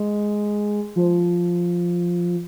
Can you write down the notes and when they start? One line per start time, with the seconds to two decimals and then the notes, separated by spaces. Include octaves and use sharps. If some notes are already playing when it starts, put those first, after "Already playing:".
Already playing: G#3
0.96 F3